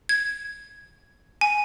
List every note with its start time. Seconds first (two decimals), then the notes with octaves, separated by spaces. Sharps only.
0.09 G#6
1.41 G#5